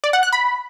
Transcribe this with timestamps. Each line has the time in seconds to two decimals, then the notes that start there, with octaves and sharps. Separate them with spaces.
0.04 D5
0.13 F#5
0.23 F#6
0.32 B5